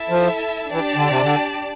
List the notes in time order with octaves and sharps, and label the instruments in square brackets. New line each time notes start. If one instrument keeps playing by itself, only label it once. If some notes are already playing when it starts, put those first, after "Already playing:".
Already playing: [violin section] E4 A4 E5 A5
[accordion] F3
[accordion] E3 [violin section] D4 G4 D5 A5
[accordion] D3
C3
D3